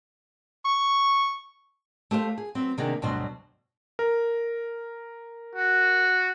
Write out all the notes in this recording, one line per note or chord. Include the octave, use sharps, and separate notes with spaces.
C#6
A3 G4 C5 F5
G#4
F#3 C4 B4 C5
C3 D#3 A#3 B3 D4 G#4
D2 G2 B2 F#3 D4 C5
A#4
F#4